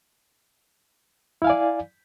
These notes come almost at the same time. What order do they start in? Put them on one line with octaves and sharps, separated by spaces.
E4 F5 G#5 D5